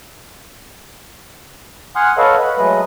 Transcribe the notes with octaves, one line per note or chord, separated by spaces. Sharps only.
F#5 G#5 C6 D#6 F6 F#6
A4 B4 C#5 D#5 F5 F#5
B4 B5
F#3 G#3 A3 B4 D#5